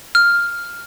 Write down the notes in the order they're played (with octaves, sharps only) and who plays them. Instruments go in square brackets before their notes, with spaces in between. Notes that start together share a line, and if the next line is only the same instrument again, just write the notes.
[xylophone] F6